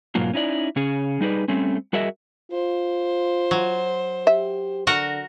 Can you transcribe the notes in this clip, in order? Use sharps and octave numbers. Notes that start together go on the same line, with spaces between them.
G#2 B2 F#3 A#3 F4
C#4 D#4 E4 D5
C#3 C#4 G#4
G3 D#4 G#4 B4 D5
G3 A3 C4 C#4
G3 F#4 G#4 A#4 D#5 E5
F4 C5
F#3
G4 E5
D3 F#4 A#4 F#5